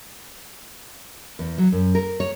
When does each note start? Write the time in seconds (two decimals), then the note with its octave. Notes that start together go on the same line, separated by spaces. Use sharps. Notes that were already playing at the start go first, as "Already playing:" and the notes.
1.39 E2
1.58 F#3
1.72 F#2
1.95 A#4
2.20 C#5